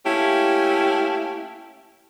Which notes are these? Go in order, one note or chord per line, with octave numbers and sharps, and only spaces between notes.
A3 A#3 C#4 E4 G4